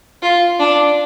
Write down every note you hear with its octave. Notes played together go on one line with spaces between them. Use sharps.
F4
D4